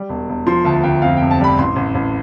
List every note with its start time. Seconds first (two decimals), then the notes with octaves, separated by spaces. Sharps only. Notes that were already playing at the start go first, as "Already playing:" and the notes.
Already playing: G3
0.09 E1
0.29 E1
0.47 F3 C6
0.65 D2 A5
0.83 D2 G5
1.02 F2 F5
1.17 F1 G5
1.31 A5
1.40 G3 B5
1.58 A1 C6
1.76 A1
1.95 A1